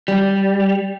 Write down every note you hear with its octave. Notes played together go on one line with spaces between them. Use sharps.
G3